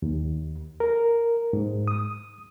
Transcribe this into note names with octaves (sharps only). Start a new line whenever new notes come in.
D#2
A#4
G#2
D#6